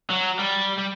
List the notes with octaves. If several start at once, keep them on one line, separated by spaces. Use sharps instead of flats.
F#3
G3
G3